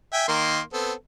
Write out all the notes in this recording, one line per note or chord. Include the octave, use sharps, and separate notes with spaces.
E5 G5 G#5
D#3 A#3 C6
B3 C4 A4